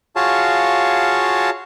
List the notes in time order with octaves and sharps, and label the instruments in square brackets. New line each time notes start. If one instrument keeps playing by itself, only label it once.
[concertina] F4 F#4 G#4 C#5 F5 A5